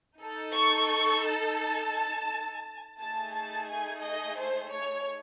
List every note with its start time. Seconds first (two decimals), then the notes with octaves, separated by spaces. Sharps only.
0.18 D#4 A4
0.53 C#6
0.88 C#6
1.24 A5
2.99 A3 D#4 G#4 A5
3.33 A5
3.69 G#5
4.04 D#5
4.39 C5
4.74 C#5